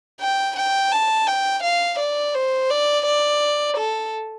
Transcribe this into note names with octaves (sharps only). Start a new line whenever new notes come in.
G5
G5
A5
G5
F5
D5
C5
D5
D5
A4